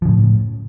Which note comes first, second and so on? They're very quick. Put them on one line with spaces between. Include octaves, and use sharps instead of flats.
F3 C#3 A2